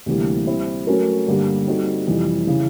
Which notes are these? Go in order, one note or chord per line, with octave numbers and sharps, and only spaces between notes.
D2 C3 E3 G3 A#3
G3 C4 E4
F#3 A3 C#4 F#4 A#4
G2 D3 G3 A#3
G3 C4 D#4 F#4 A4
F2 C3 E3 G3
C#3 E3